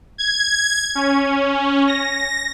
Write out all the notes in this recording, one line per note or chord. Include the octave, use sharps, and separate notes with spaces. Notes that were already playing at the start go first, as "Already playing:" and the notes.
G#6
C#4
A#6